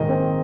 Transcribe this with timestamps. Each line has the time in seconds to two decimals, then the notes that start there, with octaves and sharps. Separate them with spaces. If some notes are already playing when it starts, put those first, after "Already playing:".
Already playing: A#1 G#2 D#3 A#4 D#5
0.09 C4